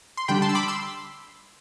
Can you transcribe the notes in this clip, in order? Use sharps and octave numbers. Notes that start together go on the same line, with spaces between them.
C6
D3 G3 D4 G5 B5
A5 C6
E6
B5 D6
C6 E6